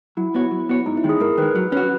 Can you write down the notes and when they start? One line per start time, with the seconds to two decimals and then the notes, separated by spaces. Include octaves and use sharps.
0.17 F#3 E4
0.35 B3 F#4 C#5
0.51 F#3
0.69 B3 F#4 C#5
0.86 G#2 D#4
0.97 E4
1.04 D#3 G#3
1.09 G#4
1.20 G#2 A#4
1.37 D#3 G#3 B4
1.55 F#3
1.72 C#4 F#4 B4